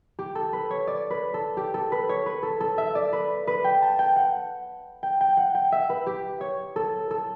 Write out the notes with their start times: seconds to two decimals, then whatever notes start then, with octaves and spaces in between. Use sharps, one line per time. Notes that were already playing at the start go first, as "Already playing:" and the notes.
0.19 G4
0.35 A4
0.53 B4
0.71 C#5
0.87 D5
1.10 B4
1.34 A4
1.57 G4
1.74 A4
1.92 B4
2.09 C#5
2.26 B4
2.43 A4
2.60 A4
2.78 E5
2.95 D5
3.13 B4
3.47 B4
3.64 G5
3.82 A5
3.99 G5
4.16 F#5
5.03 G5
5.21 G5
5.37 F#5
5.55 G5
5.72 E5
5.89 B4
6.06 G4
6.41 C#5
6.76 A4
7.11 A4